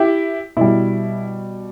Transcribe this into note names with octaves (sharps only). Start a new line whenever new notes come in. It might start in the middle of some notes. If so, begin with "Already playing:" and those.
Already playing: E4 G4
B2 G3 E4